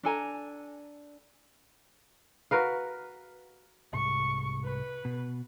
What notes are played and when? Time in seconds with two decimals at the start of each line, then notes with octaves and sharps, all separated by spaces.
0.03 D4 A4 G#5 A#5
2.51 F#4 A#4 B4 F5
3.93 C2 G#2 C#6
4.64 B4
5.05 B2